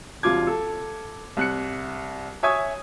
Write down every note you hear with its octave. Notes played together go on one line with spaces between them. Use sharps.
E1 C2 F4 D6 G#6
A4
C2 F#6 C#7
C#5 E5 G#5 C#6 D#6 G#6